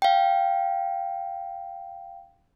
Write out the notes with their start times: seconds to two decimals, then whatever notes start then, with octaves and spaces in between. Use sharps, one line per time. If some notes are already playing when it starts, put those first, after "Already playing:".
0.02 F5 G5